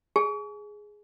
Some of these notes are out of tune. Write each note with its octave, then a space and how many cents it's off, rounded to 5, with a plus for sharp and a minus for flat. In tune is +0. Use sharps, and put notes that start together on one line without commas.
G#4 +0 G#5 +30